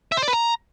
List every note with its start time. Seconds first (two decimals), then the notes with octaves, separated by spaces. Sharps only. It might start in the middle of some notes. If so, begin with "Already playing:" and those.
0.12 E5
0.17 C5
0.23 D5
0.28 B4
0.33 A#5